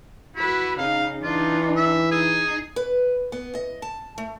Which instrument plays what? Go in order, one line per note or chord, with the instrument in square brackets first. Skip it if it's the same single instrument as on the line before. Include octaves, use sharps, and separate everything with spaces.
[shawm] E4 [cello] F#4 B4
[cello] C#3 D#4 [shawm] F5
[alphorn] E3 [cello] D4 D#4 [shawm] F4
[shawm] E5
[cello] D#4 [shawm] G#4
[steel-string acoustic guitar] B4
B3
D#5
A5
A3